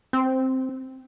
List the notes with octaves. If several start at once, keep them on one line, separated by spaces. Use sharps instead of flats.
C4